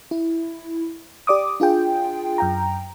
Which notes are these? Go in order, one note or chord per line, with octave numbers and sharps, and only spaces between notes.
E4
G4 D5 D6 D#6
D4 F4 G#4 G5
F#2 G5 A#5